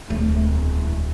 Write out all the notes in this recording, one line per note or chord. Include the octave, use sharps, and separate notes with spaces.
D1 A3
E1